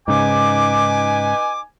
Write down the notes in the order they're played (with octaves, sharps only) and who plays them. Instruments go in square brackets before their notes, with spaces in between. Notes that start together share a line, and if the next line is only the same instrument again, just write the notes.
[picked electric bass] G#2 C#3 [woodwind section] D#4 B4 D6 [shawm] G#5